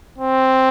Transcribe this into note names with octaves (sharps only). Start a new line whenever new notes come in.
C4